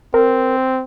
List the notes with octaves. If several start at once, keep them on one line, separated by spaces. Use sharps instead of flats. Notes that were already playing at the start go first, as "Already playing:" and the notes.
C4 A#4